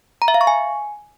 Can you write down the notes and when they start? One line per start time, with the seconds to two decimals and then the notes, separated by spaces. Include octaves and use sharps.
0.22 A#5
0.28 E5
0.34 F5
0.41 C#6
0.47 G#5